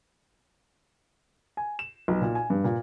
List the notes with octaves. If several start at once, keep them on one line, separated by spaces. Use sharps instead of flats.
G#5
E7
B1
A#2
G#5
G2
A#2